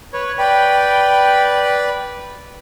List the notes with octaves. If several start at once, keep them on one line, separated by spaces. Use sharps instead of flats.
B4 C#5
B4 D5 G5 B5